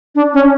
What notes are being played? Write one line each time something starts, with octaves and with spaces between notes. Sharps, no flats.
D4
C#4